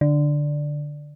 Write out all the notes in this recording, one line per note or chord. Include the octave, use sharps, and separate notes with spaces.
D3